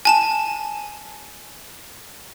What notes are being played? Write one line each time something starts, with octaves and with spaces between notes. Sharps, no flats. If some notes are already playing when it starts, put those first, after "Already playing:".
G#5 A5 E7